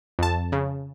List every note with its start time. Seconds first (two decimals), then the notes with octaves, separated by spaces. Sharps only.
0.19 F2 A5
0.52 C#3